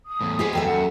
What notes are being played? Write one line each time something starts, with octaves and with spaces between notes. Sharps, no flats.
D#6
E2 A2
G#3 B3 G4 G#4 C5
D#2 A4 E5 G5
F#2 F#5